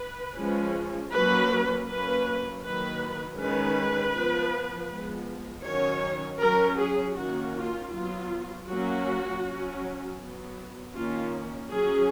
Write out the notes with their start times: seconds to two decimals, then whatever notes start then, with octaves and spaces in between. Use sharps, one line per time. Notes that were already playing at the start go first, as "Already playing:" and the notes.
Already playing: B4
0.37 F3 G#3 C#4
1.13 F#3 A#3 C#4 B4
1.88 F#3 A#3 C#4 B4
2.63 D#3 F#3 A#3 B4
3.39 D#3 G#3 C#4 B4
4.14 F3 B3
4.90 F3 G#3 B3
5.65 D#3 F#3 C#4 C#5
6.41 F#3 C#4 A#4
6.80 G#4
7.16 D#3 A#3 C#4 F#4
7.55 F4
7.92 F#3 B3 F4
8.67 F#3 A#3 C#4 F#4
9.43 F#3 C#4
10.19 F#3 B3
10.94 D#3 A#3 C#4 F4
11.70 F#3 C#4 G#4